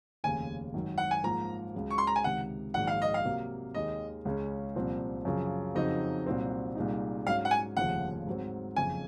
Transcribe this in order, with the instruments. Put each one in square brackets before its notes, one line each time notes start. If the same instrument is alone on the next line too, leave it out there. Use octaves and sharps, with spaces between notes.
[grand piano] F1 D#2 C#3 [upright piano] G#5
[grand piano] G#1 F#2 D#3 F#3
[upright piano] F#5
G#5
[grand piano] G#2 F3 A#3 F4 G#4 [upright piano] A#5
[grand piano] C#2 C#3 F#3
[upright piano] C#6
C6
A#5
G#5
[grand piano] C#2 C3 D#3 [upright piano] F#5
[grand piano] A#1 G#2 D#3 F#3 [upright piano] F#5
[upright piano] F5
D#5
F5
[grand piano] C3 F#3 A#3
[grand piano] D#2 D#3 G#3 [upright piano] D#5
[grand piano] C#2 C#3 G#3 C#4
C2 A#2 F3 C4
F#2 C#3 F3
[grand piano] F2 C#3 F#3 C4 D#4 [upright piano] D#5
[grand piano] C2 A#2 F#3 C4 F#4
C2 A#2 G#3 D#4
[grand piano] G#2 F#3 C#4 [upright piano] F5
[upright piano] F#5
G#5
[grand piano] F1 D#2 C#3 F3 [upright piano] F#5
[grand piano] G#2 F#3 C4
[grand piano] F#1 F2 C#3 [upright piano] G#5